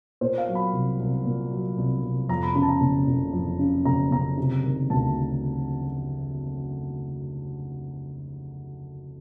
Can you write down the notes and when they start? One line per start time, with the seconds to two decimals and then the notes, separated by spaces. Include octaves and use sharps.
0.21 A#2 C5
0.38 F5
0.47 F#3
0.55 B5
0.73 C2
0.99 C2
1.25 A#2
1.51 F#3
1.78 C2
2.03 C2
2.29 F2 A#5
2.43 B5
2.55 C#3 B5
2.62 A5
2.69 A#5
2.81 F#1
3.07 F#1
3.33 F2
3.59 C#3
3.85 F#1 A#5
4.11 F#1 A#5
4.37 C3
4.64 D#3
4.90 D2 A5